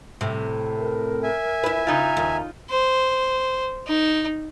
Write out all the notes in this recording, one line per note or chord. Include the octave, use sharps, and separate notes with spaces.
A2 C3
A#4
E5 G#5
E4 B4
C#3 D#4 F4 A#5
D#2
C5
D#4